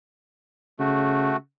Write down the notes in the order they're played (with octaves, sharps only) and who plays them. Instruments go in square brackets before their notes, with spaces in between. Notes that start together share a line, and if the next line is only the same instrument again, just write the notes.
[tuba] C#3 [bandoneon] A3 F#4